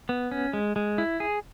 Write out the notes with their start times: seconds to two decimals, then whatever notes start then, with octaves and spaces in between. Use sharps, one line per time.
0.09 B3
0.31 C#4
0.53 G#3
0.76 G#3
0.98 E4
1.20 G#4